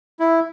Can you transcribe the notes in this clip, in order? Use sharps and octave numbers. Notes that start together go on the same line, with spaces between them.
E4